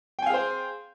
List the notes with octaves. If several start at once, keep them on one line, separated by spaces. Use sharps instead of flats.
G#4 C5 F5 G5 G#5